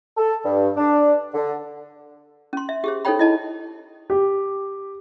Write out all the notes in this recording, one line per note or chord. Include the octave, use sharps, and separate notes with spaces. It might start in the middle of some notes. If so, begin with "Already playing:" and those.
A4
G2
D4
D3
C#4 C6
E5
G4 G#4 C5
D#4 A4 C5 C#5 G5 B5
E4 D#5 A5
G4